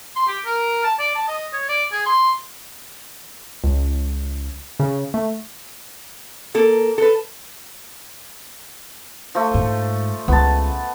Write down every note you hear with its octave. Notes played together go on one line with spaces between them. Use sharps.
C6
G4
A#4
A5
D5
A5
D#5
C#5
D5
G#4
C6
C#2
C#3
A3
A#3 A4
A4 B4
F3 A3
G#2
C#2 B3 A5